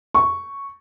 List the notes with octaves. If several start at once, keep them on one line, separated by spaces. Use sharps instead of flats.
C#6